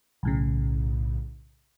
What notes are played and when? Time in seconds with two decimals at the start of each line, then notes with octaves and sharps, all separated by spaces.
0.23 B1 A2 C#3